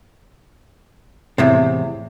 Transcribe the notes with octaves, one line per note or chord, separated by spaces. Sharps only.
E2 A2 C3